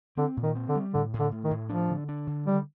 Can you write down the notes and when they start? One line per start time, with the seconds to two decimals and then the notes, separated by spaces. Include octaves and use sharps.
0.17 D3 C4
0.37 A#2
0.43 D#3
0.55 C4
0.69 D3
0.75 G3
0.94 A2 D3
1.13 A2
1.19 D3
1.32 A2
1.44 D#3
1.51 A2
1.69 F3 D4
1.90 D3
2.09 D4
2.27 D3
2.46 D#3 G3